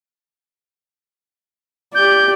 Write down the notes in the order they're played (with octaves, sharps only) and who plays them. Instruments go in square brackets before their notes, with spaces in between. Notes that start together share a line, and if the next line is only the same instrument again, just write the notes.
[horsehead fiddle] G4 D5 [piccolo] G6